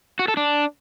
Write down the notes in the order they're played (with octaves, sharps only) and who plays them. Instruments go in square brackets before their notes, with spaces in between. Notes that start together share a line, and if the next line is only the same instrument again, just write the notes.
[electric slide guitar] F#4
A4
D4